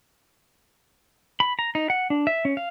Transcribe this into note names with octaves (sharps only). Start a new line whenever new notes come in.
B5
A#5
D#4
F#5
D4
E5
C#4
F5